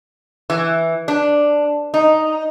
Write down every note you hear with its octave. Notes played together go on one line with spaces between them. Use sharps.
E3
D4
D#4